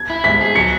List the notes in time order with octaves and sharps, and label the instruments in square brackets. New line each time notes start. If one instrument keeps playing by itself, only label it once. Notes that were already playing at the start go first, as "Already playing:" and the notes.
Already playing: [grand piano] G#6
[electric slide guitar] E4
[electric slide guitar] G#2 [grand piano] B6
[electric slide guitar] G#4
[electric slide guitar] F#3 [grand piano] C#7